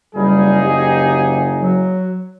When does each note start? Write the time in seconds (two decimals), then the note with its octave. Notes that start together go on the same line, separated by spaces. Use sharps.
0.15 F#1 G3 D#4 G#4
0.64 G4
1.61 F#3